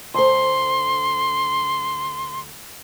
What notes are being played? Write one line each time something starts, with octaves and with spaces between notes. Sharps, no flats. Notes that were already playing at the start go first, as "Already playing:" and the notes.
D2 C5 C6